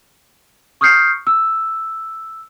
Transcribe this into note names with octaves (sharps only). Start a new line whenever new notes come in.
C#6 D#6 F6 G6 C7 C#7
E6